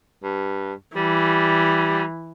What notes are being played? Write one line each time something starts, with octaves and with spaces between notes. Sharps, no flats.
G2
E3 G3